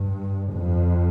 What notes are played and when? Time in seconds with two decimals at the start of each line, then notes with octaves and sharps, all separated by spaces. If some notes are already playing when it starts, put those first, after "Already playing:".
Already playing: G2
0.53 F2